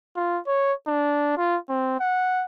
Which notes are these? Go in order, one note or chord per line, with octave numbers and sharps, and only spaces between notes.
F4
C#5
D4
F4
C4
F#5